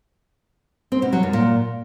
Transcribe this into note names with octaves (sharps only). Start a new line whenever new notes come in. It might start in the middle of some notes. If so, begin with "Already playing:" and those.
C4
B2
F#3
F#2
A#2